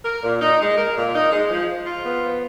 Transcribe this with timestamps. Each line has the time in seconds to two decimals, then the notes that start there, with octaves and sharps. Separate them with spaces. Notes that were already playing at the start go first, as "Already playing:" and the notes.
0.05 A#4
0.23 A#2
0.41 D#4
0.60 G#3
0.78 A#4
0.96 A#2
1.14 D#4
1.31 G#3
1.50 F3
1.69 F3
1.86 F4
2.05 B3
2.23 F3